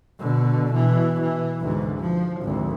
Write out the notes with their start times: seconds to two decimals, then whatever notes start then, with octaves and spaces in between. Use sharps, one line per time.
0.19 B2 D3
0.74 B2 E3
1.21 E3
1.62 D2 G#2
2.00 F3
2.42 G#1 D2